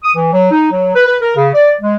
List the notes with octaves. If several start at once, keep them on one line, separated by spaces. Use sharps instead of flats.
D#6
E3
F#3
D#4
F#3
B4
B4
A#4
C#3
D5
G#3